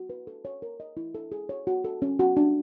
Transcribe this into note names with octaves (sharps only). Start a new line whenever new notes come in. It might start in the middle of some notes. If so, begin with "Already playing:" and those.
Already playing: F#4
B4
A4
C#5
A#4
D#5
E4
A4
G#4
C#5
F#4
A4
C#4
F#4
D4